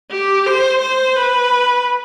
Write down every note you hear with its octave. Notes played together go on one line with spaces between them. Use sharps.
G4
C5
C5
B4